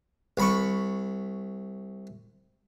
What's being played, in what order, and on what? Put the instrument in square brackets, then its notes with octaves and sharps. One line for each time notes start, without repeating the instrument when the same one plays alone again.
[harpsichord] C2 B5 C#6